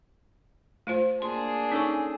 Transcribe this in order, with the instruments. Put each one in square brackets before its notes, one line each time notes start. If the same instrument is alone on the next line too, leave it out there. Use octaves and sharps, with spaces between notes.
[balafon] A3 F4 C5
[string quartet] A#3 D4 G#4 [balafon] C6
[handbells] C#4 A4 [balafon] D#4 C#6